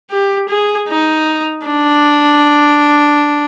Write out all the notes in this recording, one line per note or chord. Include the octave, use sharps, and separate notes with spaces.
G4
G#4
D#4
D4